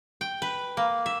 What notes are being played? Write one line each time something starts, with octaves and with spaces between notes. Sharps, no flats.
G5
B4
A#3
E5